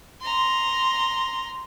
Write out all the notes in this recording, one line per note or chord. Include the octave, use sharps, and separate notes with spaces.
A#5 C6